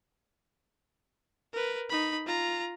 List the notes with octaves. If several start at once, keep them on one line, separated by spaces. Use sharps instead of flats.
A#4 B4
D#4 B5
F4 A#5